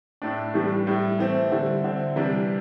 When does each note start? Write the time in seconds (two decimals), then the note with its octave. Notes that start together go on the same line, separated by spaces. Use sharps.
0.22 A2 A3 D4
0.54 A2 E3 G3 D4
0.87 A2 G3 E4
1.19 E3 A3 C4 E4
1.52 D3 G3 C4 E4
1.84 D3 C4 E4
2.16 C3 E3 G3 D4